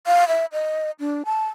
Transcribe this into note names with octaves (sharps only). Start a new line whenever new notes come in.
F5
E5
D#5
D4
A5